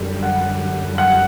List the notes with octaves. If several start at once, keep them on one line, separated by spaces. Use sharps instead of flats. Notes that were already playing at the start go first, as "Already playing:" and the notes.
Already playing: F#2 D3 G3
F#5
F#5